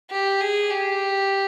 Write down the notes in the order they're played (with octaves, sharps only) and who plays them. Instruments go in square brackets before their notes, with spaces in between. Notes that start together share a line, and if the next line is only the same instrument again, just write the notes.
[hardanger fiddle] G4
G#4
G4